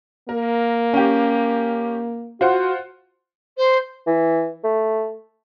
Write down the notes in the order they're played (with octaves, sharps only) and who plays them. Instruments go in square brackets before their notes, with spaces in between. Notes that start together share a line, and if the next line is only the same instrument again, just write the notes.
[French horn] A#3 [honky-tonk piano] A#4
[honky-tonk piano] C#4 G4
[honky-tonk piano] F4 C5 F#5 [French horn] F#4
[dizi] C5
[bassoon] E3
A3